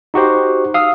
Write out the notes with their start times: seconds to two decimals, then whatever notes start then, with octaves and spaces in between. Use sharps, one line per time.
0.14 D#4 F#4 G4 C5
0.74 F5 D#6 E6